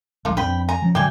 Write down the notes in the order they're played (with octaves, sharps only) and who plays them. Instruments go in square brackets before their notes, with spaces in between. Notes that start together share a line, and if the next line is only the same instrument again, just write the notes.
[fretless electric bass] E1 A#1 [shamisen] A#3 D#4 F4
[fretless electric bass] F2 C4 D4 [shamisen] B4 [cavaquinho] G5 B5
[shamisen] G#5 [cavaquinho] A#5
[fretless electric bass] F3 C#4
[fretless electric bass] G#2 D3 F#3 [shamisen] D4 E4 D5 [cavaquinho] G5 G#5